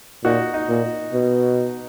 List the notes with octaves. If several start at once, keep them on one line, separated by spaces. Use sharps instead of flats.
A#2 D#4 F#4
D#4
A#2
B2